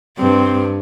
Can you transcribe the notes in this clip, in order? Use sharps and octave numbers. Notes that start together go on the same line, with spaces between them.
G2 C4